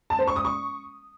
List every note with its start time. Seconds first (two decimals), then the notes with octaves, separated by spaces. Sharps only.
0.10 A5
0.19 C5
0.27 C#6
0.36 D#6
0.45 C#6